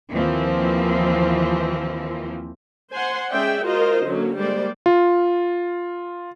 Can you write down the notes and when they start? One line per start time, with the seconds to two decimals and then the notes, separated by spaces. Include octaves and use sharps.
0.12 D#2 E3 F3 A#3 C4
2.92 C5 F#5 G#5 C6
3.31 G#3 C#4 G#4 D5 E5 G5
3.63 F4 F#4 A#4 C5 D#5
4.04 D3 F#3 A#3 C#4
4.38 G3 G#3 A#3 C5 D5
4.86 F4